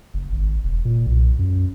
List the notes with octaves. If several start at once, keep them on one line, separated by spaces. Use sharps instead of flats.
F#1
G#1
E1
A#2
B1
F#2